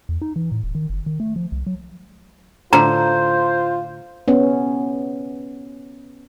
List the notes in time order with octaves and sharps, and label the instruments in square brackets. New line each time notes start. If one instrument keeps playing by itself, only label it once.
[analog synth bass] E2
D#4
E3
A2
D#1
D#3
F#1
D#3
A3
F3
C2
F#3
[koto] A2 D3 [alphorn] F4 [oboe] C5 [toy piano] A#5
[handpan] B3 C#4